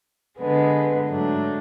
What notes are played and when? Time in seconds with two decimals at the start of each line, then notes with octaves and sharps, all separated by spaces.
0.39 D3 G#3 B3
1.08 G#2 F#3 A3 D4